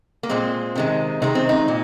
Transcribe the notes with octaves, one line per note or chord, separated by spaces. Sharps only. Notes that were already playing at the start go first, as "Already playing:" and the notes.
A#3
A#2 G#3 C4
C3 D#3 G#3
C3 D#3 G#3 D#4
C4
D#4
A#2